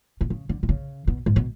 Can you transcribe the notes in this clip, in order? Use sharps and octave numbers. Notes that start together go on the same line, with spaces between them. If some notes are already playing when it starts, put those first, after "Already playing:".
B2
C#3
D3
B2
C#3
B2
G#2
B2